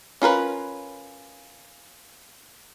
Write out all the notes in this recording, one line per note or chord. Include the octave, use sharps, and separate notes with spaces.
C#4 F4 A#4 B4